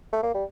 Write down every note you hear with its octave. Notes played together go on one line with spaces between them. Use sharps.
A3
A#3
G3